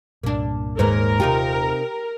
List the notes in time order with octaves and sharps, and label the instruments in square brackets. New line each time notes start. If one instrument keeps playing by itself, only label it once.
[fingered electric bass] C2 G2 A#2 [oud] A#3 D4
[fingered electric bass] D#1 [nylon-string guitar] G#2 [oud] A#3 B4 C#5 [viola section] A#4
[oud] C3 D#4 F4 [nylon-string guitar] G4